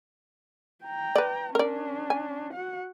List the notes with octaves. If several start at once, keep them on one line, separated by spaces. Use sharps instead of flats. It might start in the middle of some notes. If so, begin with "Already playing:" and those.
G5 A#5
B4 D5
C#4 D4 A#4 D5
G#5
F#4 F#5